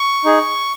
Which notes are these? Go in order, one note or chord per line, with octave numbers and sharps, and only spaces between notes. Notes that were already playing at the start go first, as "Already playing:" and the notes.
Already playing: C#6
D#4 G#4